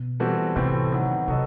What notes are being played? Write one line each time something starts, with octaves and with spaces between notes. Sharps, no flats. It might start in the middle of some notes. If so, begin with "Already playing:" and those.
Already playing: B2
E3 G3 C4 F#4 A4
A2 C3 E3 A3 C4
D#3 F#3 B3
C3 F#3 B3 F#4 A4 D#5